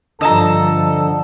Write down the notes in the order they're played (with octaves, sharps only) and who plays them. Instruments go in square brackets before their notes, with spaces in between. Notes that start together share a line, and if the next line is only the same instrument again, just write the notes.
[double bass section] G2 F3 [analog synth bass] D3 [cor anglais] A4 [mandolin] D#5 A5 A#5